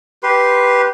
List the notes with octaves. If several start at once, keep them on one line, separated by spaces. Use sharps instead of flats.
G4 B4 C6